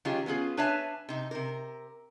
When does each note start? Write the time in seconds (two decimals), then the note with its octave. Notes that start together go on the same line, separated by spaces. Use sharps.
0.05 D#3 F#3 C#4 F4 G4 G#4
0.26 B3 C#4 F4 G#4
0.57 D4 B4 C#5 E5 G#5 A5
1.09 C3 D#4
1.31 C3 A#4